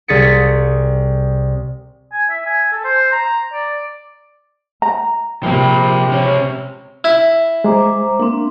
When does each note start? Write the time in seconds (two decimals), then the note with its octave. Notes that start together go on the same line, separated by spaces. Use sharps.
0.08 C2 G#4 A6 B6 C#7
2.12 G#5
2.30 E5
2.46 G#5
2.72 A4
2.84 C5
3.12 A#5
3.53 D5
4.82 A#5
5.43 C3 F3 A#3 G5 B5
6.11 C#2 C#4
7.04 E4
7.64 G#3 C5 A#5 D6
8.20 A#3 C4 D4